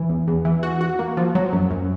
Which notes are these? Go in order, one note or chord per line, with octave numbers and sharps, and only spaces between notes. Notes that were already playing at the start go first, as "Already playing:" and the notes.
Already playing: E3
E2
E2
E3
F#4
F#4
A#3
F3
F#3
F#2
F#2